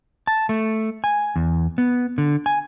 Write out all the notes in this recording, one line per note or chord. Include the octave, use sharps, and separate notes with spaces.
A5
A3
G#5
E2
B3
D3
G#5